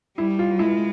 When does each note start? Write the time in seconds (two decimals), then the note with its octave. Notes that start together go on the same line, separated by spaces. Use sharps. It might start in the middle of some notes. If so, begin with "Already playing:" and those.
0.18 G3 E4
0.39 F4
0.59 G#3 E4